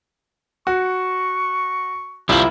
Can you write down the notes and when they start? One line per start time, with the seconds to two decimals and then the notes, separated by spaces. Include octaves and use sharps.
0.67 F#4 C#6
2.29 C2 G3 C4 E4 F4 C5 F#7